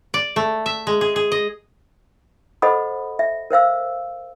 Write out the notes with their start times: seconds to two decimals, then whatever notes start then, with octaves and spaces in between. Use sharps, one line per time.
0.14 D5
0.36 A3
0.66 E5
0.87 G#3
1.01 G#4
1.16 G#4
1.32 D#5
2.62 A4 C5 D#5 F#5 B5 D#6
3.19 E5
3.51 A#4 C5 F5 E6